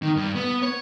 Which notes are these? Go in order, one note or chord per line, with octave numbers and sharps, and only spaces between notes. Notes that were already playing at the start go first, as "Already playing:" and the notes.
D#3
G2
B3
C#5